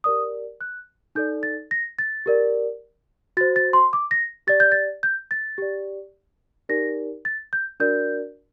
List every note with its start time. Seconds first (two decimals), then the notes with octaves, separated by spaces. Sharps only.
0.04 G4 A#4 D5 D#6
0.61 F#6
1.15 D#4 A4 D5 G6
1.43 A6
1.71 A#6
1.99 A6
2.26 G4 A#4 D5
3.37 F#4 A6
3.41 C5
3.56 A6
3.73 C6
3.93 D6
4.11 A#6
4.47 G4 D5 A6
4.60 G6
4.72 A6
5.03 G6
5.31 A6
5.58 G4 D5
6.69 D#4 G4 A#4 D5 A#6
7.25 A6
7.53 G6
7.80 D4 F#4 A#4 D5 G6